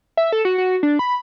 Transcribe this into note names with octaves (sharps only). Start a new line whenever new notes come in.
E5
A4
F#4
F#4
D4
B5